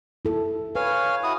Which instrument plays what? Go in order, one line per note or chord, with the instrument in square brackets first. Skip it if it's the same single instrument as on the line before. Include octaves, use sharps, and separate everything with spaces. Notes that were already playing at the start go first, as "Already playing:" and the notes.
[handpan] E4 A4
[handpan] B4 [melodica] C#5 F5 G#5
[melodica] E4 F#4 D#6